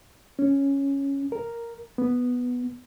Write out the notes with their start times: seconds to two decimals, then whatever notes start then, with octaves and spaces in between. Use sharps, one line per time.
0.39 C#4
1.32 A#4
1.98 B3